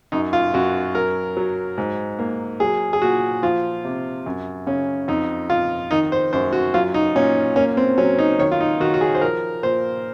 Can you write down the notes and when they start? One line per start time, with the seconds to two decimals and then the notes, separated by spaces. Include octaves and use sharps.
0.12 F#2 D#4
0.33 F4
0.54 F#2 F#4
0.95 F#3 A#4
1.37 F#3
1.78 G#2
2.19 A#3
2.60 F#3 G#4
2.93 G#4
3.02 A#2 F#4
3.42 F3 F4
3.85 C3
4.26 F#2
4.66 C#3 C#4
5.08 F2 D#4
5.49 F2 F4
5.91 D#3 D#4
6.12 C5
6.33 F#2 C5
6.53 F#4
6.74 F#3 F4
6.94 D#4
7.15 A#2 C#4
7.56 A#3 C#4
7.77 C4
7.98 F#3 C#4
8.19 D#4
8.39 D#3 C#5
8.52 F4
8.60 D#4
8.80 D#3 F#4
8.94 F#4
9.01 G#4
9.15 C5
9.21 F3 A#4
9.63 A#2 C5